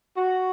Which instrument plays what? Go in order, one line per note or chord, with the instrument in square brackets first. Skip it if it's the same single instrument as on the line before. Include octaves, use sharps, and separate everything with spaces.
[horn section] F#4